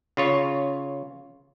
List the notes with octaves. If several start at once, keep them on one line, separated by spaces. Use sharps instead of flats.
C#3 F4 C#5